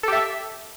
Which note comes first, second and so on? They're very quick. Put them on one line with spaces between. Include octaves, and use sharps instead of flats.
A4 G4 E5